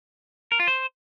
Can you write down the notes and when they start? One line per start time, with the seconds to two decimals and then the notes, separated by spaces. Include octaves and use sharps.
0.52 A#4
0.60 F4
0.67 C5